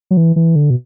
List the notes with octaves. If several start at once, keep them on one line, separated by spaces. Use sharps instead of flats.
F#3
E3
E3
D3
B2